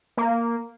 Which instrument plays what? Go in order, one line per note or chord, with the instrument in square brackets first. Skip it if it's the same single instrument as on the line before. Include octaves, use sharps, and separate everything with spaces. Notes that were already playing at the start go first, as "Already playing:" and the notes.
[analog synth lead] A#3